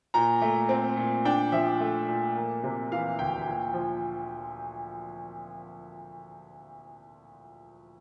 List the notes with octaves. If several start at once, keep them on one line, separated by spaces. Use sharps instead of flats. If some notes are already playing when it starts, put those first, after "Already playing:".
A#2 A#5
A3
C4
A#2
D4 G5
F3 E5
A3
A#2
A#3
C3
E3 F5
D2 G5
A#2
F3